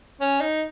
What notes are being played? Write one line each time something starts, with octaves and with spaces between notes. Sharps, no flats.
C#4
D#4